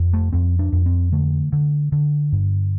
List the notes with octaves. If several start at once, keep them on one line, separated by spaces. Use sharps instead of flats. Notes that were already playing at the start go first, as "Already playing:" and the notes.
Already playing: F2
A3
F2 C4
D4
F2
C4
D3 A3
D3
D3
G2